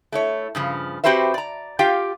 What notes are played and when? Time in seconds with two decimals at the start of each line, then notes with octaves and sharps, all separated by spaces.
0.12 A3 E4 C#5
0.55 G2 C#3 F3
1.04 C4 F#4 G4 B4 C5 E5
1.34 D5 A#5
1.79 F4 G4 F5 G5